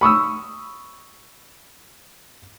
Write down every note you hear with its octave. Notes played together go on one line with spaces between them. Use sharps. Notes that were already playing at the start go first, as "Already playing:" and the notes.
B5 C#6 D#6 E6